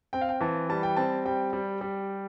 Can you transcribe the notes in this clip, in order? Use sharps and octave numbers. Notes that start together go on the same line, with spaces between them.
C4 G5
F5
G5
E3 A5
G3 A5
G5
C4 A5
G3 G5
G3
G3